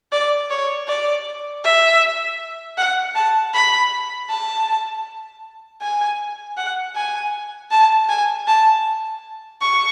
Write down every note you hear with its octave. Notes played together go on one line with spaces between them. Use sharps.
D5
C#5
D5
E5
F#5
A5
B5
A5
G#5
F#5
G#5
A5
G#5
A5
C#6